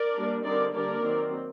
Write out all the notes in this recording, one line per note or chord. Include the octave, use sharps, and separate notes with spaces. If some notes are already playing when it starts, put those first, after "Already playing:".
Already playing: A#4 D5
G3 A#3 D4
D3 G3 C4 D#4 A#4 D5
D3 G3 A#3 D4 A#4 D5
D#3 F#3 C4